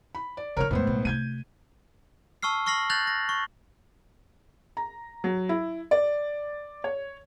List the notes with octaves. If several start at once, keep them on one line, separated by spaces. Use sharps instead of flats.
B5
D5
C#3 F3 A#4 C#5 F6
E2 A2 G#3 B3 C5
B1 G#3
C3 A3 G6 G#6 D#7
A5 C#6 E6 F6 C7
C#6 F6 A#6 C7 F#7
F#6 G6 A6 A#6 F7 F#7
A#6
C#6
A#5
F#3
E4
D5
C#5